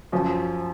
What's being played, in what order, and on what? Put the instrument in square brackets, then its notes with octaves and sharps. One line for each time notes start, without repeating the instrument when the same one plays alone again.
[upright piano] F#2 F3